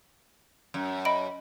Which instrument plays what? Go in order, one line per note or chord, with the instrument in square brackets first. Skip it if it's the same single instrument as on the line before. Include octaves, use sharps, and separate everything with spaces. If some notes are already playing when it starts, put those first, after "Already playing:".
[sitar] F#2
[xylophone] D#5 B5 D7